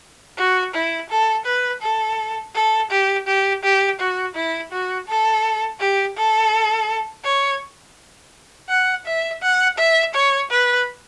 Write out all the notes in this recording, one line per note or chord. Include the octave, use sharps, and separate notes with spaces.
F#4
E4
A4
B4
A4
A4
G4
G4
G4
F#4
E4
F#4
A4
G4
A4
C#5
F#5
E5
F#5
E5
C#5
B4